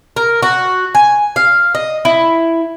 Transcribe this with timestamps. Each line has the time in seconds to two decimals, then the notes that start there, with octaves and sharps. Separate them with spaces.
0.16 A#4
0.42 F#4
0.95 G#5
1.36 F5
1.75 D#5
2.05 E4